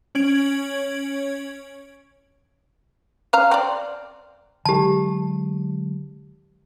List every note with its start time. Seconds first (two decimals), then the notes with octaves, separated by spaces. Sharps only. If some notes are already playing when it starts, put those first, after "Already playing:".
0.15 C#4 C#5 G#6 D7 F#7
3.33 C#4 F5 A#5
3.51 C4 D5
4.65 D3 F#3 G#3 G4 A5